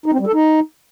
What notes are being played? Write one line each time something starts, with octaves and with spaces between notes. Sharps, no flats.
D#4
C4
G3
A4
D#4